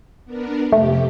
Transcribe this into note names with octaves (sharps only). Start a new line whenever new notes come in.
B3 D4 A#4
F2 C3 A3 G4